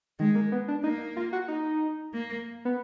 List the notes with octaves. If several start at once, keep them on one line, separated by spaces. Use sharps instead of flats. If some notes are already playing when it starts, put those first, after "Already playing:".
D#3 G#3
A#3
B3
D4
A#3 D#4
F4
F#4
D#4
A#3
B3